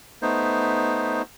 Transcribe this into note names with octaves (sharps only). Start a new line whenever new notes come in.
A3 B3 D#4 C5